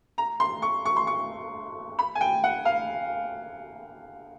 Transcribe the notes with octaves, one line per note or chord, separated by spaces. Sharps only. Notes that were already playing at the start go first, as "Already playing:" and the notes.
A#5
C6
C#6
C#6
C6
C#6
B5
G#5
G5
F#5
F5